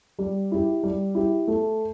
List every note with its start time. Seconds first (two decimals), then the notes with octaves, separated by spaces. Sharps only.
0.19 G3
0.52 E4 G4
0.83 G3
1.15 E4 G4
1.48 A3